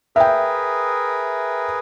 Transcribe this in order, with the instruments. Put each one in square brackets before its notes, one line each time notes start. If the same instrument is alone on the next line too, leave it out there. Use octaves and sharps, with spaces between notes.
[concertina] G#4 A#4 B4 [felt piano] E5 G5